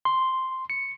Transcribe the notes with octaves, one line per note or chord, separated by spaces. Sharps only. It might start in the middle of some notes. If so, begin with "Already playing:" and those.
C6
C#7